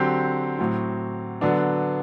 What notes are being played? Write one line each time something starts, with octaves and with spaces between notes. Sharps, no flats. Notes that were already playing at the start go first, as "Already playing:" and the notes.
Already playing: D3 F#3 C4 G4
A2 F#3 C4
D3 F#3 B3 D4